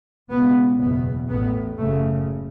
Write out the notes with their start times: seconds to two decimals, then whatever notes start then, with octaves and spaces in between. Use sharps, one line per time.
0.30 C#2 B2 B3
0.79 F#1 E2 B2 B3
1.29 A1 A2 B3
1.78 F#1 F#2 C#3 A3